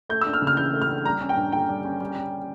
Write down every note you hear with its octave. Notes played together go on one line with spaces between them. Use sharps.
A3 G6
D4 E6
F6
C#3
F6
E3 G6
A3
F6
D4
G3 A#5
C#4
G5
G2
D3 G5
G3
C#4
G3
C#4